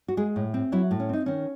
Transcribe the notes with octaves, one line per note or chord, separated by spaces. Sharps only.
F#4
G#3 G#4
A2
C4
F#3 E4
A2
C#4
C4 D#4
D#3 C#4